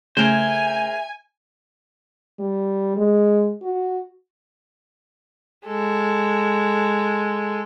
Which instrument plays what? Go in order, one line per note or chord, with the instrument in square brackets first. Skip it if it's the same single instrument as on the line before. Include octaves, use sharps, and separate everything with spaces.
[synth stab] C#3 A3 [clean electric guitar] G#4 A#4 C5 [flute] E5 [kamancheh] G#5
[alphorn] G3
G#3
F#4
[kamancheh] G#3 A4